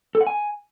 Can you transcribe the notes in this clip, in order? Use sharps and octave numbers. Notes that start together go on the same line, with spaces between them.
A4
F#5
G#5